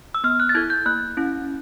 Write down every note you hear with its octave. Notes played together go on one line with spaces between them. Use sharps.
E6
B3 F6
F#6
A6
E4 A4 G#6
G6
A#3 F#6
C#4 E4